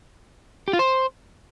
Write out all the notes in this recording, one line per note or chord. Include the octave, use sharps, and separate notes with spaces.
G4
F4
C5